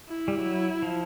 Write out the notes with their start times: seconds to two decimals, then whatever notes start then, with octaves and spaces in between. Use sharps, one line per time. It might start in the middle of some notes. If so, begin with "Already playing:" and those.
0.09 E4
0.28 G3
0.38 F#3
0.83 F3